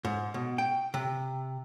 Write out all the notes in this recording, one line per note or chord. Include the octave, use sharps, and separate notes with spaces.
G#2
B2
G5
C3